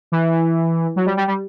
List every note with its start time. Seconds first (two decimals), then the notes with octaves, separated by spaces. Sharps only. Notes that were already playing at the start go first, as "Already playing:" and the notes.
0.12 E3
0.96 F#3
1.06 G3
1.17 G3
1.28 G3